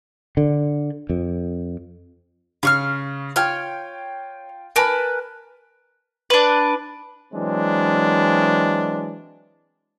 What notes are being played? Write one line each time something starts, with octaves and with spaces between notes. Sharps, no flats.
D3
F2
C#3 F5 C#6 F6
F4 C#5 G5 F6
A#4 B4 G#5 A5 B5
D4 B4
E3 F#3 G#3 C4 D4